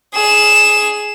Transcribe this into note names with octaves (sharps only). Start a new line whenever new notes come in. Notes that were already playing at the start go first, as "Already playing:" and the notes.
G#4 E7